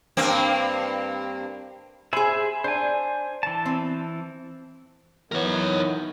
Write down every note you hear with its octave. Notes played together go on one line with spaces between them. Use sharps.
G2 A#3 C4
G#4 C5 E5 G#5 B5
D4 C5 G#5
E3 A5
C4
D#3 E3 F#3 B3 A#4 C#5